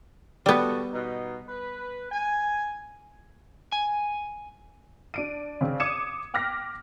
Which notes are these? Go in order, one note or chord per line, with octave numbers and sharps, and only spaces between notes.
G3 B3 F#4 A4
B2 D#4
B4
G#5
G#5
D4 D7 D#7
C#3 C4 D4
D6 D#6 G#6 C#7 D#7 E7
G5 D6 F6 F#6 A#6 B6